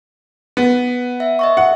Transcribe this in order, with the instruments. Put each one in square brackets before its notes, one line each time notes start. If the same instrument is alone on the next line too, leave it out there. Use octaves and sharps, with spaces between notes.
[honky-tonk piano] B3
[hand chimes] E5
D#5 E5 C#6
[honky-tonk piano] F#5